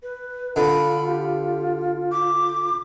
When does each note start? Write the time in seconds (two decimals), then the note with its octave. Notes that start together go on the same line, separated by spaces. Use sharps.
0.03 B4
0.56 D3 F4 B5
1.07 G4
2.12 D6